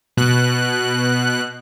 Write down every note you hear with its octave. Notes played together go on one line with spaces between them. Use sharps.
B2 F#6